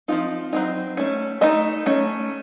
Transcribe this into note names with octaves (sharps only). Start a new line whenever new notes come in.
F3 C4 D#4 F4
F#3 C4 D#4
A3 C#4
A3 D#4 D#5
A3 C#4